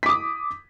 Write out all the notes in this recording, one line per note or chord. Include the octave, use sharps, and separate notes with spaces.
D6 D#6 B6